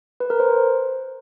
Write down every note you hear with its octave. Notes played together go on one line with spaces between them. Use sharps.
B4
A#4
C5